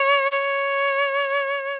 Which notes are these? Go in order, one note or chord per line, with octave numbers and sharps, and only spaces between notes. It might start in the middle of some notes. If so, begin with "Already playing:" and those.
Already playing: C#5
C#5